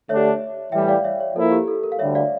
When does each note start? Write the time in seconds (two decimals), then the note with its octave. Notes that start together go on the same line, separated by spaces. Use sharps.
0.09 D3 A3 D4 G4 C#5 E5
0.72 A2 E3 G3 E5 G5
0.88 D5 F5
1.04 C#5 E5
1.20 C#5
1.36 F3 A#3 E4 A4
1.52 G4
1.68 A4
1.83 A#4
1.92 F5
1.99 D2 D3 G3 C#5 E5
2.15 D5 F5